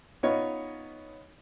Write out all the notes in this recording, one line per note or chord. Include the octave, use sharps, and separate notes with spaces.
B3 C#4 D#4 F4 C#5 D#5